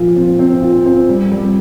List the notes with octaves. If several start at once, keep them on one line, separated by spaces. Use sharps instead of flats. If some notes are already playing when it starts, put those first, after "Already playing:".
Already playing: A#2 F3 F4
C4
C4
F4
C4
G3
G3